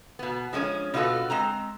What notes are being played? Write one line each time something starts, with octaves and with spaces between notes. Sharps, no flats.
B2 B3
F3 G#3 B3 C#4
B2 D#4 F4 F#4 A4 B4
G#3 C4 A#5